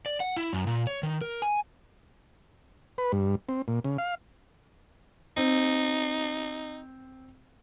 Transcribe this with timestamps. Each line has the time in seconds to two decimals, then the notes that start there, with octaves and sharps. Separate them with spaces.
0.06 D5
0.20 F#5
0.37 E4
0.53 F#2
0.67 A#2
0.87 C#5
1.03 D#3
1.21 A#4
1.42 G#5
2.98 B4
3.12 G2
3.49 C4
3.68 A#2
3.85 C#3
3.98 F5
5.37 C4 D#4